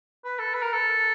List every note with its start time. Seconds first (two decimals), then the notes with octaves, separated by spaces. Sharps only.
0.24 B4
0.39 A4
0.54 B4
0.63 A#4
0.73 A4